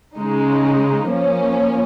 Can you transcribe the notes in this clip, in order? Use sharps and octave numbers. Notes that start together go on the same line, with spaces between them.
C#3 G#3 D#4
F3 A#3 C#4